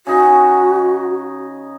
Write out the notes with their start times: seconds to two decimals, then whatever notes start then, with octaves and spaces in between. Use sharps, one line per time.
0.07 C#3 D#4 F#4 C#6